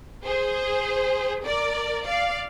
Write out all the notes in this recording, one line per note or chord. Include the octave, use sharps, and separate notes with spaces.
G#4 C5
A#4 D5
D5 F5